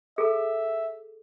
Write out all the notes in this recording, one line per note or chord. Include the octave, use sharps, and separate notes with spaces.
G#4 A4 E5